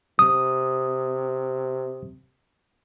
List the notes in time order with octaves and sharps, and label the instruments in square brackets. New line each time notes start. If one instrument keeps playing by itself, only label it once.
[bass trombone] C3 [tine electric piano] D#6